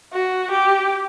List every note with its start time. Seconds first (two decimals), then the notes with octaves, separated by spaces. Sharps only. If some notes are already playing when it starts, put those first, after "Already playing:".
0.13 F#4
0.51 G4